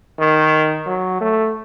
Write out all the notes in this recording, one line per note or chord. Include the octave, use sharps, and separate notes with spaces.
D#3
F#3
A3